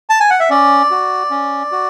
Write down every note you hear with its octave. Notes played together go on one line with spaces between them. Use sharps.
A5
G#5
F#5
E5
C#4 D5
F#4
C#4
F#4